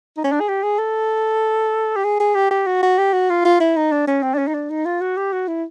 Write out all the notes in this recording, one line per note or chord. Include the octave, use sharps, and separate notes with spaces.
D#4
C#4
D4
G#4
G4
G#4
A4
G4
G#4
G#4
G4
G4
F#4
F#4
G4
F#4
F4
F4
E4
D#4
D4
C#4
C4
D4
C#4
D#4
D4
D#4
F4
F#4
G4
F#4
E4